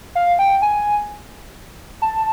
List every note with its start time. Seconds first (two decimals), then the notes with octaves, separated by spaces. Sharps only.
0.15 F5
0.39 G5
0.62 G#5
2.02 A5